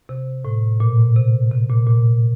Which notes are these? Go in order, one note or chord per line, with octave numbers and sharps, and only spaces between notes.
C3
A2
A#2
C3
C3
A#2
A#2